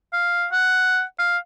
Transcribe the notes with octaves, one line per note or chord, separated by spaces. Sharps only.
F5
F#5
F5